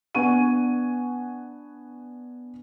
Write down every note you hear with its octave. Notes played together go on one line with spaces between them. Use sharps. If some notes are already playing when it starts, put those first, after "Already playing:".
B3 D4 F#5 G#5 C#6 D#7